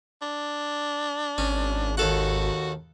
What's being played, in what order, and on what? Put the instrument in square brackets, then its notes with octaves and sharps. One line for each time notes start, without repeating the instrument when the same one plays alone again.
[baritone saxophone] D4
[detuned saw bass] G#1 [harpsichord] C#4
[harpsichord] D#2 A4 F#5 [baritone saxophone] F#4